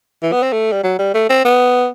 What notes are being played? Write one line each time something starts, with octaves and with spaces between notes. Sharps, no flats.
E3
B3
C4
A3
G3
F#3
G3
A3
C4
B3